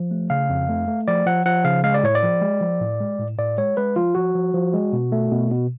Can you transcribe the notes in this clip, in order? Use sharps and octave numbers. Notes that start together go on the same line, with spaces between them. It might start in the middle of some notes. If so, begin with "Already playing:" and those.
Already playing: F3
A3
C#3 F5
F2
A3
A3
F3 D5
F3 F#5
F3 F#5
C#3 F5
G#3 F5
D5
A2 C#5
D5
F3
G#3
F3
A2
G#3
A2
A2 D5
G#3 C#5
G#3 B4
F3 F4
F3 F#4
F3
F3
G#3
B2
A3
B2
B2